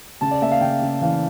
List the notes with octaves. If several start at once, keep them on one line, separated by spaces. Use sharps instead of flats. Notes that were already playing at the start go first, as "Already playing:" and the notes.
C#3 A5
D5
A#3 E5
F5
C#3 G5
C#3
E3 F5